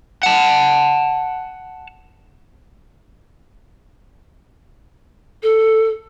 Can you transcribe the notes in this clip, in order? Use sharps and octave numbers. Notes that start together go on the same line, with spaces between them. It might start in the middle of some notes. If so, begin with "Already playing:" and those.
F#5 A5
A4